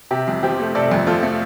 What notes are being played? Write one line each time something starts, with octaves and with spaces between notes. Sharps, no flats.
C3 G4
F2
F3 G4 C5
A3
C3 A4 D5
F2
F3 F4 A4
A3